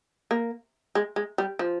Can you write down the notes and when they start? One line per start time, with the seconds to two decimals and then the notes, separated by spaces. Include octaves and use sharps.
0.31 A#3
0.95 G#3
1.16 G#3
1.38 G3
1.59 F3